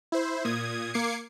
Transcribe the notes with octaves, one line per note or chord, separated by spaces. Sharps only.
E4 C5
A#2 D#6 G#6
A#3 D6 G#6 C7 C#7